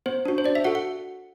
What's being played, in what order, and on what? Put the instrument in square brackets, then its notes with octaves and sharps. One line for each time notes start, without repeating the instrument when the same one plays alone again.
[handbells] B3 C5
D4 F#4
C5
D4 D5
E5
F#4 A4 F#5
F#5